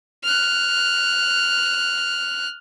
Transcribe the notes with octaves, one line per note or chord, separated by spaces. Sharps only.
F6 F#6